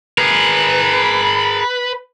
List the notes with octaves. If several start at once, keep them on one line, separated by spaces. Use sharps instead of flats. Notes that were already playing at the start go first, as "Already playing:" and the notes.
G#4 A#4 B4